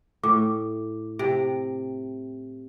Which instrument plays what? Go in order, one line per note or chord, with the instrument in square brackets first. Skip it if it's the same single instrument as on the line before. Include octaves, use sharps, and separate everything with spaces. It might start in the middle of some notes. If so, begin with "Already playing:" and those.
[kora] A2 [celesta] D6
[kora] C3 [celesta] G5 D7